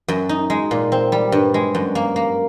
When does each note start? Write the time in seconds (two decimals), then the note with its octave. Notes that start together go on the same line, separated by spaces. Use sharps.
0.08 F#2
0.29 D#4
0.50 G#3
0.71 A#2
0.92 C4
1.12 G3
1.32 G2
1.54 G#3
1.75 F#2
1.95 A#3
2.16 A#3